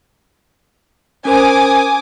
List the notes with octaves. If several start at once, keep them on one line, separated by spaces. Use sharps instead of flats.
C#4 A#4 C5 G#5 D6 D#6